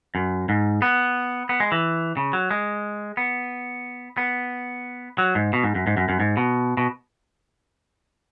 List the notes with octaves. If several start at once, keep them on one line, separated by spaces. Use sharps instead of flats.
F#2
G#2
B3
B3
G#3
E3
C#3
F#3
G#3
B3
B3
F#3
G#2
B2
G#2
F#2
G#2
F#2
F#2
G#2
B2
B2